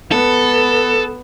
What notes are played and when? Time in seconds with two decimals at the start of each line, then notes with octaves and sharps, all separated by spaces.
0.12 B3 A4